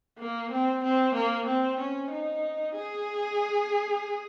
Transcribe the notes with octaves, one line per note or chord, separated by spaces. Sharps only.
A#3
C4
C4
A#3
C4
C#4
D#4
G#4